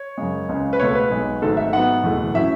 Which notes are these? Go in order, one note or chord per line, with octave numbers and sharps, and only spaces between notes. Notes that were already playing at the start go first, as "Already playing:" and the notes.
Already playing: C#5
F#2 C#3 G#3
C#2 C#3 G#3 C#4
B4
C#2 B2 A3 C#5
B4
B1 B2 G#3
G#1 G#2 F#3 A3 A4
E5
G#2 F#3 B3 F#5
F#1 E2 B2 A3
A2 F#3 C#4 E5